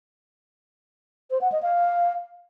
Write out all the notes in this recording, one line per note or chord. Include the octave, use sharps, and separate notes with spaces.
C5
F#5
D#5
F5